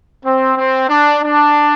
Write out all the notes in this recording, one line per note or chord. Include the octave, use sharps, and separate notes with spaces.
C4
C4
D4
D4